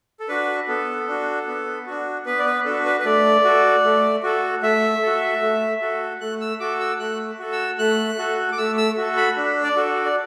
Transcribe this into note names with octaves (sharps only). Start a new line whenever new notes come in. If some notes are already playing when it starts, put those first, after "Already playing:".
A4
D4 F#4 B4
B3 A4
D4 F#4
B3
D4 F#4
B3 B4
D5
B4
D4 F#4 A4
B4
B4
A3 D5
F#4 A4
A3
F#4 A4
A3 E5
F#4 A4
A3
F#4 A4
A3 F#6
E6
F#4 A4 D6
E6
A3 F#6
F#4 A4
E6
A3 F#6
F#4 A4
D6
A3 E6
E6
F#4 A4
B5
D4
D5
F#4 A4
D5